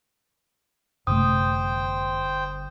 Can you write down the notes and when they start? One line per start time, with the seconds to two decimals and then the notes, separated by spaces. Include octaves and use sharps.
1.07 G1 F#2 C3 A3 C5 G5 D#6